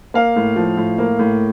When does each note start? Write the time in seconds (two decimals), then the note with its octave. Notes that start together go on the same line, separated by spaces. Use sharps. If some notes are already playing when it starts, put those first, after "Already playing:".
0.14 A#3 F5
0.36 A2
0.56 F3
0.77 A2
0.98 A#3
1.19 A2